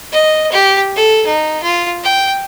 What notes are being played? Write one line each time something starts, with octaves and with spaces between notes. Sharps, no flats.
D#5
G4
A4
D#4
F4
G5